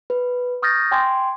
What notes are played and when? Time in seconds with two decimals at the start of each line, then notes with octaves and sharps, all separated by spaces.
0.10 B4
0.62 C#6 D#6 F6 G6 A6 A#6
0.91 G5 G#5 C6 D6 G#6